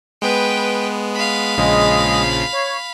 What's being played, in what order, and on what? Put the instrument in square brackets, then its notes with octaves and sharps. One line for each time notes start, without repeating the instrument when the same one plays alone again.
[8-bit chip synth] G#3 B3 [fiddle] B4 G5
[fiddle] F5 B5
[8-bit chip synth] A#1 C#3 F3 [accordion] G#3 D#5
[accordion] C#5